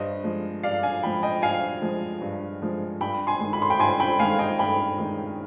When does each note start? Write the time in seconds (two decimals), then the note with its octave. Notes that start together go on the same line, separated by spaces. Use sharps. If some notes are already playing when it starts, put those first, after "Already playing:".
Already playing: G2 C5 D#5
0.24 F3 G#3
0.63 G2 D5 F5
0.83 F5 G#5
1.03 F3 G5 B5
1.06 G#3
1.23 D#5 G5
1.42 G2 F5 G#5
1.82 F3 G#3
2.22 G2
2.62 F3 G#3
3.01 G2 G5 B5
3.27 G#5 C6
3.40 D#3 G#3
3.53 B5
3.62 C6
3.70 G5 B5
3.80 G2 G#5 C6
4.00 G5 B5
4.19 G#3 F5 G#5
4.22 D#3
4.39 D#5 G5
4.59 G2 G5 B5
4.98 D#3 G#3